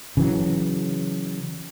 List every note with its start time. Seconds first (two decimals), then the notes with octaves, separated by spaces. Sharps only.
0.17 C#3 E3 F#3